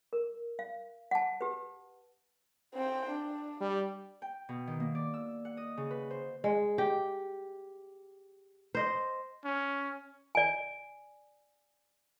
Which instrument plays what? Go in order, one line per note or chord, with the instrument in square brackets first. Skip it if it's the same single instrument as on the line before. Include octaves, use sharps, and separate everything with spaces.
[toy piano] A#4
F5
F#5 A5
G4 B4
[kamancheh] C4 G5
D4
[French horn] G3
[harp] G5
B2
D#3
A#3
D5
E6
F#5
D#5
C#3
B4
C5
[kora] G#3
G4
C5 D#5
[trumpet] C#4
[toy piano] D5 G#5